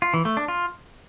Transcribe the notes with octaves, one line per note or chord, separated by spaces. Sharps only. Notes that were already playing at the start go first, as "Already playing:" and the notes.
F4
E3
A3
D4
F4